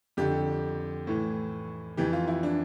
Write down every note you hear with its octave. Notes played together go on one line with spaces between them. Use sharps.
F2 D3 G4
A2 E3
F2 E3 G4
F4
E4
D4